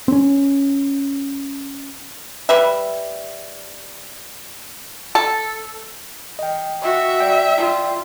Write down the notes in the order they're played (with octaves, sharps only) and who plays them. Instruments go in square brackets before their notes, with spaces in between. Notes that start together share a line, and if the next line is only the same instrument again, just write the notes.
[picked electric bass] C4 C#4
[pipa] G3 B4 E5
A4
[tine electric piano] D#5 G5
[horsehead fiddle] F#4 [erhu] E5
[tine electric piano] D5 G5
[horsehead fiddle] F4